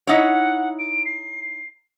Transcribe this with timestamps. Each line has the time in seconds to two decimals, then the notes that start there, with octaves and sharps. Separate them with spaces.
0.07 D#4 E4 C#5 F#5
0.79 D7
1.05 C7